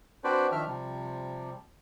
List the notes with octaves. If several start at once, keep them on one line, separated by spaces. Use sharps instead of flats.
C4 D4 F#4 B4 C5 D5
D#3 F3 D4 E5 F6
C3 F3 G3